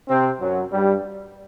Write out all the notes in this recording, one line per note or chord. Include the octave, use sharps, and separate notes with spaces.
C3 C4
F#2 F#3
G2 G3